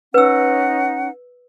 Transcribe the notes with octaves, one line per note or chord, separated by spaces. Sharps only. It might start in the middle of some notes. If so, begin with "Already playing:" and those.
C#4 D#4 B4 F#5 E6